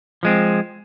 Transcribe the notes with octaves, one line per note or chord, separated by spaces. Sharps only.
F3 G#3 C4